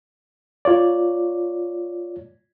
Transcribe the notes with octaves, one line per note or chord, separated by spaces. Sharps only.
F4 C#5 D5